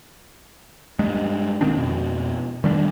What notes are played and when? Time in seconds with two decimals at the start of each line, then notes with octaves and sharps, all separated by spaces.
0.99 G2 G#3
1.61 A#1 D#3 C4 D4
1.75 F2 B2
2.64 D#3 G3 C#4 D4